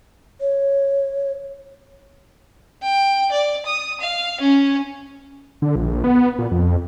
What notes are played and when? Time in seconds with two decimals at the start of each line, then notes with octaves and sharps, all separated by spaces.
0.41 C#5
2.83 G5
3.31 D5
3.66 D#6
4.01 F5
4.40 C#4
5.62 D3
5.76 A#1
6.04 B3
6.38 A#2
6.51 F2